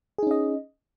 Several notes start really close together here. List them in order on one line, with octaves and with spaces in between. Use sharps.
G#4 D#4 C#4 D#5